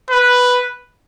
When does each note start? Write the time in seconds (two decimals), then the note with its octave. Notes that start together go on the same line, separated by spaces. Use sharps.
0.11 B4